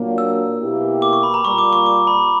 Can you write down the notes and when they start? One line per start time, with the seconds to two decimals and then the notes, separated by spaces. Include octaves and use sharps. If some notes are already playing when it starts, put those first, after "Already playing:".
Already playing: A#2 F#3 A#3 D4
0.18 E6
0.60 B2 A#3 E4 G4
1.02 D6
1.13 C#6
1.23 B5
1.34 A#5
1.44 A#2 G3 A#3 C#6
1.58 D6
1.73 C#6
1.86 D6
2.07 B5